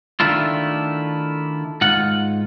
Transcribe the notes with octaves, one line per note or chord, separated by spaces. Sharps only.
D#3 A3 D4 E4 F4
G#2 F4 F#5